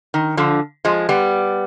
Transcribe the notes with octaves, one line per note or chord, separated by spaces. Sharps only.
D#3
D3 F3
F3 G#3
G3 B3